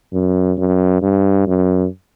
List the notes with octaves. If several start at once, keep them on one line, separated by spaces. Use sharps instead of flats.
F#2
F#2
G2
F#2